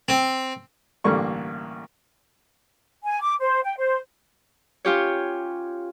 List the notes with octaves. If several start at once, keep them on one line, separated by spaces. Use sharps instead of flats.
C4
A1 G2 D3 A#3 D5 C#6
G#5
D6
C5
G5
C5
C#4 F4 G4 C#5